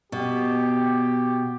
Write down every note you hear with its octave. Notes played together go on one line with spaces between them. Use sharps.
B2 G4